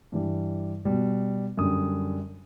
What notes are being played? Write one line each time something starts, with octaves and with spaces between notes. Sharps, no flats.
G2 E3 G3
B2 G3
F#2 D3 G3 D#6